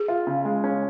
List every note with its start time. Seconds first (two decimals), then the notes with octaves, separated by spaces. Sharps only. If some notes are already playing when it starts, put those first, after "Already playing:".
Already playing: G#4
0.08 F4
0.27 C#3
0.45 G#3
0.64 C#4